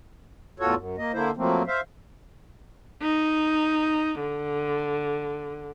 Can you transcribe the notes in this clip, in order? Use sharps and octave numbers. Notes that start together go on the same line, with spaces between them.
E2 A2 F4 F#4 A4 C#5
F#2
A#3 D#5
D3 A#3 E4 C5
F3 F#3 A3 A#3 C4
C5 E5 F5
D#4
D3